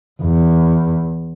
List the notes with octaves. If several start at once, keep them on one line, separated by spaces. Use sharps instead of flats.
E2